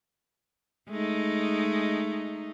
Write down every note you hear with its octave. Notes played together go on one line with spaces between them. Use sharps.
G#3 A3 D#4